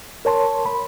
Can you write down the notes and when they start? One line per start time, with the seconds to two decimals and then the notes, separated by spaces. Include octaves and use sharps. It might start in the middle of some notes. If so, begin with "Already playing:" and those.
0.25 A#4 C#5 A5 C6
0.66 B5